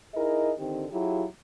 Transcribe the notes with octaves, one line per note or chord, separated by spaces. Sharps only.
D#4 E4 G#4 A#4 D#5
D3 D#3 C4 D#4 G4
F#3 E4 F4 G4 G#4